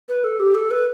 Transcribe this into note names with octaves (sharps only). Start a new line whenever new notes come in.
B4
A4
G4
A4
B4